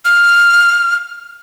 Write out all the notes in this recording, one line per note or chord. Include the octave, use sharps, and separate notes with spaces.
F6